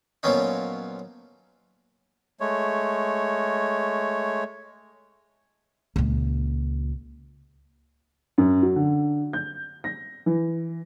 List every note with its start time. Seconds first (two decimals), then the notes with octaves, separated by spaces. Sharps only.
0.23 A#2 F3 F#3 B3 C#4 D#4
2.40 G#3 A3 C#5
5.96 C#2 A#2
8.38 F#2
8.62 F#3
8.76 D3
9.33 G6
9.84 A#6
10.26 E3